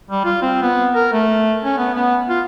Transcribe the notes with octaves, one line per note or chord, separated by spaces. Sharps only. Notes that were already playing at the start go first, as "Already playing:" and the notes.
G3
F4
C4
B3
A#4
A3
C#4
B3
B3
F4